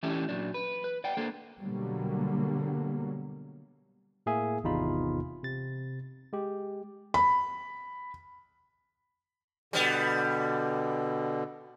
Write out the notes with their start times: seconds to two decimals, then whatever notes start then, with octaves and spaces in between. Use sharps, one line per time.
0.03 E3 A3 C#4 D4 E4 G4
0.29 A#2 F#3 D4
0.54 B4
0.84 B4
1.04 D5 F#5 G5
1.17 A#3 D4 A4 C5
1.62 B2 D3 F#3 G3 A#3
4.26 A2 A#3 G#4 E5 G#5
4.64 G#1 E2 C3 D#4 F4 B5
5.43 C3 A6
6.33 G#3 G4
7.14 B5
9.73 B2 D3 G3 B3